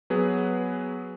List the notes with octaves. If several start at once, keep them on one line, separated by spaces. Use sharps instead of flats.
F#3 B3 G#4 B4